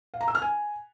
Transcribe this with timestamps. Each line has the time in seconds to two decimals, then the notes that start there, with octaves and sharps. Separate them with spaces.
0.14 F5
0.21 A#5
0.28 E6
0.35 F6
0.42 G#5